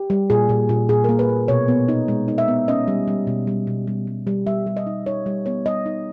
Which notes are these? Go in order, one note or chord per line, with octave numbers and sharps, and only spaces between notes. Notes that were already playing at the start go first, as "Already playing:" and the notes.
Already playing: G4
G3
A#2 G#4
A#2
A#2
A#2 G#4
A#3 A#4
B4
A#3
B2 C#5
B3
D#4
G#3
D#4
E5
B3
C#4 D#5
G3
G3
B2
G3
B2
G3
G3
G3
G3 E5
G3
D#5
D#4
D#4 C#5
G3
B3 C#5
G3 D#5
D#4